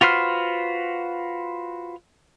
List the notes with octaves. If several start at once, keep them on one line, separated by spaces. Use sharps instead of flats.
F4 F#4 B4 C5 F6